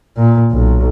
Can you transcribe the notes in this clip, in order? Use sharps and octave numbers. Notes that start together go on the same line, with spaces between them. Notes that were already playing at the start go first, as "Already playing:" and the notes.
A#2
B1